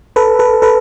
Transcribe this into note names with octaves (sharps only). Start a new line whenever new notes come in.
A4 B4
A4 B4
A4 B4